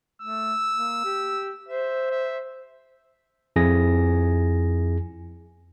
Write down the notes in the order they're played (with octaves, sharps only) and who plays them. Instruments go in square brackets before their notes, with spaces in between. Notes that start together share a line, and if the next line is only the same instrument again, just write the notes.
[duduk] A3 [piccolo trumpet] E6
[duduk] A#3
G4
[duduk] C5 [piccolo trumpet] E5
[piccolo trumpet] E5
[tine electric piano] F2 E4 G#4 G#5 A#6